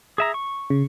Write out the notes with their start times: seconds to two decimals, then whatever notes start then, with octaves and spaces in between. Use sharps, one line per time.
0.18 G#4 E5 A#5
0.34 C#6
0.70 C#3